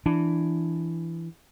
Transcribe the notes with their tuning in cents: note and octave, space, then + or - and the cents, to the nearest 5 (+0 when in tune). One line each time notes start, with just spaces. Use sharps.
E3 +10 D4 +5